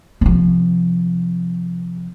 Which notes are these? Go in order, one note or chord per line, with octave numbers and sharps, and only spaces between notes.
C3 F3